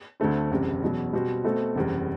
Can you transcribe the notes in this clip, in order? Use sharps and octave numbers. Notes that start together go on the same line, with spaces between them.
D2 D3 A3 C4
F#1 E2 C3 G3
E2 B2 F#3
B2 G3 C4 F#4 C5
B2 A3 C4 F#4 A4
F#1 E2 C3 G3